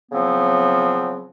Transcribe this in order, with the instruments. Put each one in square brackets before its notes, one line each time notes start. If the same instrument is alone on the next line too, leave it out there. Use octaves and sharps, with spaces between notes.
[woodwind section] C#3 F3 F#3 B3 C4